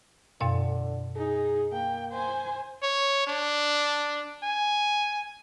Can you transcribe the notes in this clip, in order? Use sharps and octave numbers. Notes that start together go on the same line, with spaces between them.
F#2 B2 D3 F5
D#4 G#4
A#3 G5
C5 G#5
C#5
D4
G#5